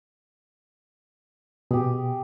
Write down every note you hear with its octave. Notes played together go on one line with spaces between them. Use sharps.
B2 G4 G#4